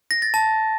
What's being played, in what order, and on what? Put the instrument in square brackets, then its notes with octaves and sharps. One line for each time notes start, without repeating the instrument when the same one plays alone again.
[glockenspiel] A#6
A6
A5